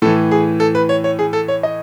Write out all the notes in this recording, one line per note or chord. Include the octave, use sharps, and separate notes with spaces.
A2 E3 A4
G#4
A4
B4
C#5
C#5
G#4
A4
C#5
D#5